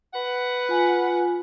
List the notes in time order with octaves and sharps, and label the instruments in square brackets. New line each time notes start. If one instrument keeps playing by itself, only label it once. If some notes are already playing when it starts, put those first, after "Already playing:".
[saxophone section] B4 F#5
[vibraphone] F4 G#5